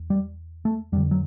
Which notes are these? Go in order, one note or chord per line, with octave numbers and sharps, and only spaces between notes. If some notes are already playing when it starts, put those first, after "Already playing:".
Already playing: E2
G3
A3
F2 G3
D3
F#3